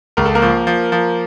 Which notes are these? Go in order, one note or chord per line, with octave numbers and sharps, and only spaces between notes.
C#2 A#4
A4
A#3 A#4
F3
F3
F3